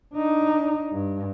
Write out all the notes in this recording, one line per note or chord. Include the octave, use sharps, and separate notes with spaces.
D4 D#4
G2